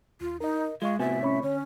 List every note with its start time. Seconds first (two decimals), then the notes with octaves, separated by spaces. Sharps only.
0.21 D#2 F4
0.40 D#4 A#4 D#5
0.82 G#3 F4 D#5 F5 C#6
0.99 A2 C3 B3 F#4 E5 G#5
1.23 C#4 C#5 B5 C#6
1.42 D3 C#4 C#5